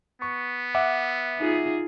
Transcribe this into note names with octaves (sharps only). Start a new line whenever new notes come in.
B3 C#6
E5 F#5 D6
D#4 F4 G#4